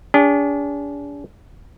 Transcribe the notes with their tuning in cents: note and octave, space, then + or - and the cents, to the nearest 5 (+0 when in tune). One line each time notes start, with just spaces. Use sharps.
D4 -40 G#4 -35